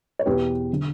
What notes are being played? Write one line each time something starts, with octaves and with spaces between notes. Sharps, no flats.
C#5
E2 B2 G4 B4
D3